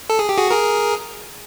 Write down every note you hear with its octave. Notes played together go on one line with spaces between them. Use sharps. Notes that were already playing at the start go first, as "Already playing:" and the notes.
A4
G#4
G4
F#4 G#4
G#4 A#4